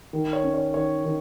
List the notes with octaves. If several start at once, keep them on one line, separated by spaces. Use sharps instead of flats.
D#3
C#5
C#4
C#5
D#3 C#5
D#3